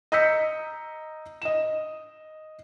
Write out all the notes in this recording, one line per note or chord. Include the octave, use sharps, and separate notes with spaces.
D#5 A#5 E6 G6 B6 C#7
D#5 E7